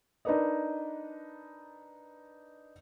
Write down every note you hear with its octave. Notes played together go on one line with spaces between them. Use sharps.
D4 D#4 A#4 B4 D5 D#5